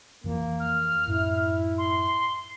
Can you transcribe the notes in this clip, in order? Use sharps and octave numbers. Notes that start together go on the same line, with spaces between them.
F2 E3 F3 A#3
F6
F#2 A2 E4
C6